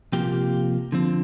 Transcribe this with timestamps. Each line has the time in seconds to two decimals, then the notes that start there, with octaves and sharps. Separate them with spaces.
0.12 C3 F3 A#3 G4
0.92 D3 F3 C4